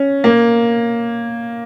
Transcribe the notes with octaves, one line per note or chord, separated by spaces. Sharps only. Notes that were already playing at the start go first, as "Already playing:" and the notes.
Already playing: C#4
A#3